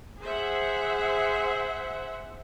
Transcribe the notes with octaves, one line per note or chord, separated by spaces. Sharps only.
G#4 C5 E5 F#5